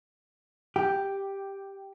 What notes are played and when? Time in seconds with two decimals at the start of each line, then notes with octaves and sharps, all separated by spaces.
0.76 G4